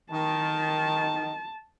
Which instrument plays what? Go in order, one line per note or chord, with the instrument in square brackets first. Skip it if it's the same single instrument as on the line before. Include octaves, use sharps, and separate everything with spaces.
[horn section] D#3 [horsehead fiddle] A5